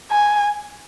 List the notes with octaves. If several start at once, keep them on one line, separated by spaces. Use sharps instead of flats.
G#5